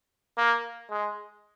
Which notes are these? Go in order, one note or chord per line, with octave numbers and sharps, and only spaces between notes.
A#3
G#3